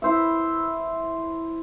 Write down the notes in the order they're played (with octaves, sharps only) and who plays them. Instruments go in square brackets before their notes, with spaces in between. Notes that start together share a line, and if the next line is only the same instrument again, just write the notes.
[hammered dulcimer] E4 C5 E5